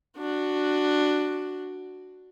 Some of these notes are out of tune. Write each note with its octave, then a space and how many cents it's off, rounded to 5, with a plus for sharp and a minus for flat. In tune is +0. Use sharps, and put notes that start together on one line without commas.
D4 +10 F#4 +0